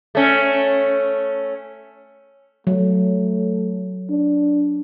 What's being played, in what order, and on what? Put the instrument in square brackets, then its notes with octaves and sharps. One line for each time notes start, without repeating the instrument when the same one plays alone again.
[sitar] A3 C#4
[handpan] F#3 [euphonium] A3
[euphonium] D4